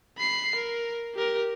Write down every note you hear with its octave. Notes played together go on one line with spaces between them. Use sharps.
B5 C7
A#4
G4 A#4